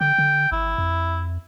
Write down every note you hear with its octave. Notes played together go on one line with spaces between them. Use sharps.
D3 G5
D3
G#1 E4
F2